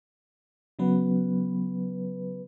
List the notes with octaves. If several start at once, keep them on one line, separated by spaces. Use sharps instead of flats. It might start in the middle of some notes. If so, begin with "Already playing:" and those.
C#3 F#3 B3 B4